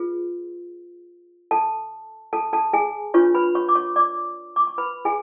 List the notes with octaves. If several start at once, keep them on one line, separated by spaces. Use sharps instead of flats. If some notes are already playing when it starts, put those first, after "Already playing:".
Already playing: F4 G#4 B4
A4 A5
A4 A5
A4 A5
G#4 G#5
D4 F4 B4 C#5 C#6
B4 B5
C#5 C#6
D6
C#5 C#6
D5 D6
D6
C#6
B4 B5
G#4 G#5